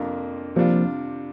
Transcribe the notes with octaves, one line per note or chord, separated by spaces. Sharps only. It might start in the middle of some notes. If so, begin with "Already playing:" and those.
Already playing: F2 C3 A#3 D4 F4
C3 F3 G3 A#3 D4 F4